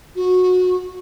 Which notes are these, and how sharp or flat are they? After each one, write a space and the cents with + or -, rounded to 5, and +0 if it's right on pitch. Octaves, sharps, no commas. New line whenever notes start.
F#4 -20